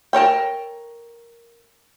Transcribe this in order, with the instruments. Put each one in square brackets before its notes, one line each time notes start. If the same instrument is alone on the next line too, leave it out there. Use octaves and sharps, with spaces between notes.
[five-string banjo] A4 A#4 C#5 G5